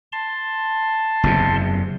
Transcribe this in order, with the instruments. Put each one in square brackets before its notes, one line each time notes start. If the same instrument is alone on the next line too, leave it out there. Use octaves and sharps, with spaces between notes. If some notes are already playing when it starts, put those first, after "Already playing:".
[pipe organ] A5 C6
[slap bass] F#1 E2 C3